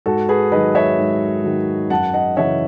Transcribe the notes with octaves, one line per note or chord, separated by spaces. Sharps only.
G#2 F#4 A4
G#4 B4
D#3 F#3 B4 D#5
C#5 E5
G#2
D#3 F#3
F#2 F#5 A5
D#5 F#5
C#3 E3 C#5 E5